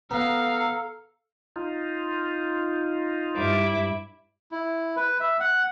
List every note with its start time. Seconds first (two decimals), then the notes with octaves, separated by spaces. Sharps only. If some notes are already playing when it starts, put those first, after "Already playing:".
0.11 B3 A4 F5 A#5
1.56 D#4 F4
3.36 G2 E4 D6
4.52 E4
4.97 B4
5.20 E5
5.40 F#5